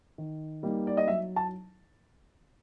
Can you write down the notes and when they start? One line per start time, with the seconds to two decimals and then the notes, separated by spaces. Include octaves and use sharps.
0.18 D#3
0.63 G3 A#3 D#4
0.87 D5
0.97 D#5
1.07 F#3 E5
1.36 A5